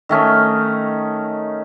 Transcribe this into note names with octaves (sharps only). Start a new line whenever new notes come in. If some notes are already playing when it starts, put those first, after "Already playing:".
D#3 A3 C#4 D#4